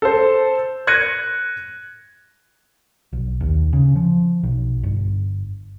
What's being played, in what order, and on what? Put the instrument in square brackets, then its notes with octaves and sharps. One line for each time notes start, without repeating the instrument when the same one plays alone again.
[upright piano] A4 C5
F#6 G#6 A#6 C#7 D#7
[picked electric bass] B1
D#2
C#3
F3
B1
G1